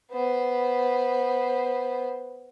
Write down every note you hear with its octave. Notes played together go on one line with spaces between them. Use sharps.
B3 C5